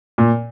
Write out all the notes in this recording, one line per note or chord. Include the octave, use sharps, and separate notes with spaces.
A#2